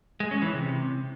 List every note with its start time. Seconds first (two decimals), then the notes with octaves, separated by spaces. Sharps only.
0.20 G#3
0.31 C#4
0.42 E3
0.53 C3